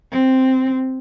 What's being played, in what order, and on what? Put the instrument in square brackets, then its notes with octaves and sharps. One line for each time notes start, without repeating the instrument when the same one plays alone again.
[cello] C4